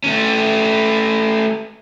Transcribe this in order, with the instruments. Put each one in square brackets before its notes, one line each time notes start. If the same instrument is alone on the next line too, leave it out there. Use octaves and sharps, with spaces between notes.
[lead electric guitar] A3 C#4